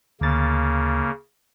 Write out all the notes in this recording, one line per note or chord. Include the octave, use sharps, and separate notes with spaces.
D2 C#3 A#3 A6